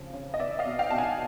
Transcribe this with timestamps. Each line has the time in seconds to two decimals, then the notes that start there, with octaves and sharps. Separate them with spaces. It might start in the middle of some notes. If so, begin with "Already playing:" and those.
Already playing: C#3 F3 C4
0.14 C#3
0.34 D#5
0.39 B3 D5 E5
0.59 D#5 F5
0.66 B2
0.79 F5 G5
0.90 B2 A5
0.98 F#5 G#5